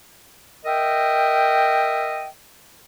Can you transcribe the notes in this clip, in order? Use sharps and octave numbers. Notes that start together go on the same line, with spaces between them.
A#4 D#5 E5 G5